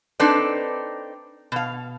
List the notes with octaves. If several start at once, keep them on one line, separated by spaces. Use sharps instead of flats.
C4 D4 D#4 A4 B4 D5
B2 F5